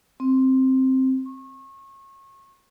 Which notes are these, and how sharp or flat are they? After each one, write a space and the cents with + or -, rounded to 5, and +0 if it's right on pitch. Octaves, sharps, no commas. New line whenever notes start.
C4 +5
C#6 -30